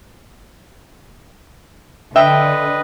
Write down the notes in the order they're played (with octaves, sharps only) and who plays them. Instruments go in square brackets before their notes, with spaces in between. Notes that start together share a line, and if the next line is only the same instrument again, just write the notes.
[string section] D3 [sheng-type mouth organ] B4 D#5 [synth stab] E5 [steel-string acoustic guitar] G5